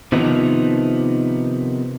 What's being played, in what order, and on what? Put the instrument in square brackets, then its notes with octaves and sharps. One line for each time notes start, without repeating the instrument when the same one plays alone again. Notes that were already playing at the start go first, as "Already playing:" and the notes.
[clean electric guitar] C3 D#3 F3 B3 D#4